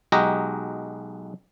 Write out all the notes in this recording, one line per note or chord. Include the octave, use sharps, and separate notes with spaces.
B1 G#3 F#4 G4 D#5 A#5